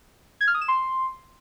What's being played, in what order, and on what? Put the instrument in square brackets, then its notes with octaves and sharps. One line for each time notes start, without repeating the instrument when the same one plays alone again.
[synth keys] G#6
F6
D#6
E7
C6